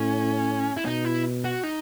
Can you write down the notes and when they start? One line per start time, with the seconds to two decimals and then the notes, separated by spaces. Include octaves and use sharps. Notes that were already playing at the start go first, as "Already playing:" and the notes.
Already playing: A2 C#4
0.77 E4
0.86 B2 D#4
1.05 E4
1.45 F#4
1.63 D#4